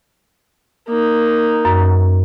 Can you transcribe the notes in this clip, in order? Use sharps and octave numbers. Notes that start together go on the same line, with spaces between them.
A#3 D#4
F#2